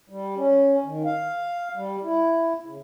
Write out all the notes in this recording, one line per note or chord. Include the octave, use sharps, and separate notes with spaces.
G3
C#4
D#3
F5
G3
E4
C#3